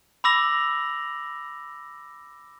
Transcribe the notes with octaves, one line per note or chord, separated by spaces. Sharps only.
B5 D6 E6 A#6 F7 F#7